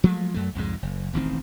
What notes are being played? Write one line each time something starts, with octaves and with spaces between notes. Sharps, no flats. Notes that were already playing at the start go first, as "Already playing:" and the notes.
F3 F#3 G#3 A3
F#2 F#3 A3
C2 F2 G#2 G#3
F#1
E1 A1 D#3 C4